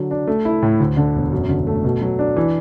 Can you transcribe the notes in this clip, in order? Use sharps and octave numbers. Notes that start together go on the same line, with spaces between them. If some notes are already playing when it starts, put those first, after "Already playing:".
Already playing: D3 F#3
D4
A3
E4
A2
D2
D3
E1
F#2
D3
A3
B2
F#3
D4
E3